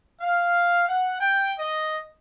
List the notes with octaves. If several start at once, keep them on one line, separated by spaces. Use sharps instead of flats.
F5
F#5
G5
D#5